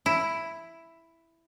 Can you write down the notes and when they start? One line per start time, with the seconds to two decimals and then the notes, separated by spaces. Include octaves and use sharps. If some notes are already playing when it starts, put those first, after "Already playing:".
0.06 E4